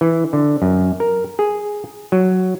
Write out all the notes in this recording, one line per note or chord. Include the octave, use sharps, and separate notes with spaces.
E3
D3
F#2
A#4
G#4
F#3